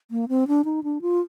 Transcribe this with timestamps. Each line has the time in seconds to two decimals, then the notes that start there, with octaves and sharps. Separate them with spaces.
0.11 A#3
0.29 C4
0.48 D4
0.65 D#4
0.84 D4
1.02 F4